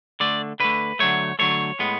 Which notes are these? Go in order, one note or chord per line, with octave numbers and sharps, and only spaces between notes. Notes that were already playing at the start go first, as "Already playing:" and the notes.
D3 A3 D5
D3 A3 B4
D3 F#3 A3 C#5
D3 F#3 A3 C#5
A2 G#3 B3